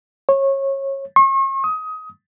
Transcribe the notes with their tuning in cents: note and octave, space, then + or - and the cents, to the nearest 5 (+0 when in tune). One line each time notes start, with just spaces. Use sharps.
C#5 -25
C#6 -40
D#6 +20